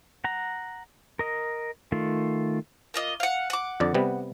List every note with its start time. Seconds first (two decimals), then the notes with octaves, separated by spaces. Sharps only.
0.24 F#5 A#5
1.19 A#4 D#5
1.92 D#3 A3 F4
2.94 A#3 F4 D#5
3.20 F5 F#5
3.50 F#5 D6
3.80 F2 D3 D5
3.94 C3 G3 B3